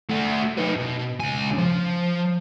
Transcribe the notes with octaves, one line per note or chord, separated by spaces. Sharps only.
A3 F#4
D#4 B4
B2
C#2 G#5
F3